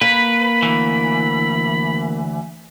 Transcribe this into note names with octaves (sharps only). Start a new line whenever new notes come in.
A#3 B4 B5
D2 E3